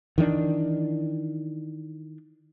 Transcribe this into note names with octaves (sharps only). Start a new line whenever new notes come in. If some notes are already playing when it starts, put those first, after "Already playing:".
D#3 E3 G#3 D4